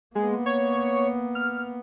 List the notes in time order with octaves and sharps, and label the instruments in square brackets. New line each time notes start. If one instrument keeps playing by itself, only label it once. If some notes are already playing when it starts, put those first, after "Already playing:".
[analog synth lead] G#3 [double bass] A#3 B3
[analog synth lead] C#5
F6